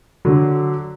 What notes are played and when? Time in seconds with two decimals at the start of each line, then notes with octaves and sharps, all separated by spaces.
0.25 D3 F#3